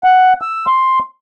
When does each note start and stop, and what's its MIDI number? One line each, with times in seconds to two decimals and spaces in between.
0.04 0.33 78
0.42 0.66 88
0.67 0.99 84